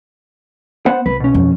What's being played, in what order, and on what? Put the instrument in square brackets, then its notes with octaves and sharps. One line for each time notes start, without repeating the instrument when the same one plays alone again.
[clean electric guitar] B3 C5 F#5
[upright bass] C2 [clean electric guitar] B4
[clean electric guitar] B2 C#4
[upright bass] F2